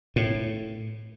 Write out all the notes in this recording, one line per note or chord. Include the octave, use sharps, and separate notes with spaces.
A2